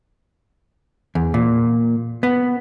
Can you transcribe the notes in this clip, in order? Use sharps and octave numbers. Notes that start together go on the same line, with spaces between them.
E2
A#2
B3